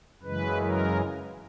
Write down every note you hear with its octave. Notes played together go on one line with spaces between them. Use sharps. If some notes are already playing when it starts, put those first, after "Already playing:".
F#2 C#3 E3 G#3 B4
A#4